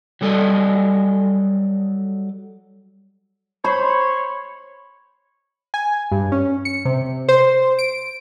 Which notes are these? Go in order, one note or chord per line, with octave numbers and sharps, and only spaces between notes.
F#3 G3 A4 D5 D#5
C5 C#5 B5
G#5
G2
C#4
C#7
C3
C5
D7